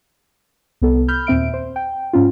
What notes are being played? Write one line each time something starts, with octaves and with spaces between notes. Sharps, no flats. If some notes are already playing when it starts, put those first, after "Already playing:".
C2 B3 A4
B5 F6 G6
D#2 A#2 C4 E5 D7
C5
G5
G#2 C#4 F4